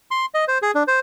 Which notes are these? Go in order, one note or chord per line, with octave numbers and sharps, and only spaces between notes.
C6
D#5
C5
G#4
D4
C5